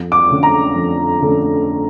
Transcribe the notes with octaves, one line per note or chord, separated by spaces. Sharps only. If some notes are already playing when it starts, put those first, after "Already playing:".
Already playing: F2
D6
D3 A3 C#4
A#5
F2
D3 A3 C#4